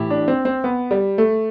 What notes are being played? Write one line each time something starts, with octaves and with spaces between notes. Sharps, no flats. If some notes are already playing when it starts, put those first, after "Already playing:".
Already playing: A2 E3 E4 G4
D4
C4
C4
B3
G3
A3